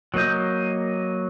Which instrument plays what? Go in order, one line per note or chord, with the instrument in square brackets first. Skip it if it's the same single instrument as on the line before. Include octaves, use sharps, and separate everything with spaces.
[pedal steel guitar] F#3 A#3 D#5 G6